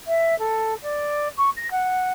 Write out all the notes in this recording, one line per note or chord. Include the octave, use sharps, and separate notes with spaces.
E5
A4
D5
C#6
A#6
F#5